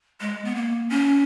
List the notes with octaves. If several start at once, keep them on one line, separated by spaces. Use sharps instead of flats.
G#3
B3
A#3
C#4